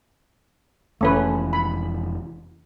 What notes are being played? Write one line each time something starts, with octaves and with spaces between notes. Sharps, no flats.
F1 E3 A3 C#4 B4
B5